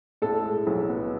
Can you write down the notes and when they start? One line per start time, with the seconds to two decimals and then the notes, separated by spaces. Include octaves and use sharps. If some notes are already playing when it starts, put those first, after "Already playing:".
0.22 A2 A4
0.44 G#3
0.67 B1
0.89 B3